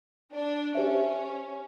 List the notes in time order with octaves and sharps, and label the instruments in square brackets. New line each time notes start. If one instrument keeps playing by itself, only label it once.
[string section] D4
[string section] C#4 [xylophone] G4 C5 E5